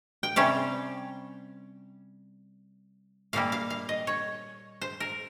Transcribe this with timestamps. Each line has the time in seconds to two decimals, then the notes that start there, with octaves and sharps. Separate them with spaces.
0.23 G5
0.36 C3 G3 C#4 F5
3.33 A#2 G3 A#3 F5
3.52 F5
3.70 F5
3.89 D#5
4.07 C#5
4.81 C5
5.00 A#4